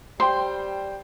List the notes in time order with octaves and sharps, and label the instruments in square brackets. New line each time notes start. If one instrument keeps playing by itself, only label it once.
[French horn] G3 [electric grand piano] C5 G5 [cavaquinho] C6